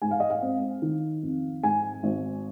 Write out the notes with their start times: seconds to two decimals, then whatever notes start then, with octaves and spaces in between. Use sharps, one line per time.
0.02 G#2 G#5
0.11 F5
0.20 D#5
0.30 F5
0.42 C4
0.82 D#3
1.23 F2
1.63 G#2 G#5
2.03 G#1